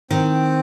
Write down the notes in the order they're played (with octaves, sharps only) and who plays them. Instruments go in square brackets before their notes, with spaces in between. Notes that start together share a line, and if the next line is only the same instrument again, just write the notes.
[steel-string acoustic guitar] D#3 [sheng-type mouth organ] C4